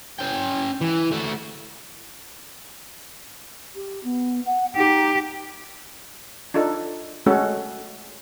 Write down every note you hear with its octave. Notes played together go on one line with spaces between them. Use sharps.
C#4 G5
E3
A3 F#4
G4
B3
F#5
D#4 G4
D4 D#4 F4 A4
G#3 A3 C#4 F#4 A4